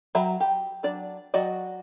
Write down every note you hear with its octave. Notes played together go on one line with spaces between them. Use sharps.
F#3 E5 A#5
G4
F#3 D4 D5
F#3 F#4 D5 D#5